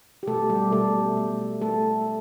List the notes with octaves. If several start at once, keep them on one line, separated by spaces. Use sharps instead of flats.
G4
B2 A3 A4
G3 G4
B2 A3 A4
A3
A3 A4